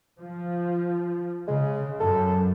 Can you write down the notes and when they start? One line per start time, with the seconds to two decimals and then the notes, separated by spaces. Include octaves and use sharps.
0.20 F3
1.47 C#3 G#3
2.00 F#2 A4